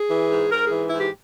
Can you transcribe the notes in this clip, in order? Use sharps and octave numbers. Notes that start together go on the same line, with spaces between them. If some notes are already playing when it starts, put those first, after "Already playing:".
Already playing: G#4
E3
G#2
G#2 A#4
G#4
E3
E4
G#2 G4